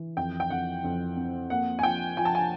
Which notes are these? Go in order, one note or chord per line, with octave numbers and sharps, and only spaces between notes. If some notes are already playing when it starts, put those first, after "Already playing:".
Already playing: E3
F2 G5
G5
F2 F#5
F2
C4
A#3 F#5
G#5
F3 G5
F3 G#5
A5
G#5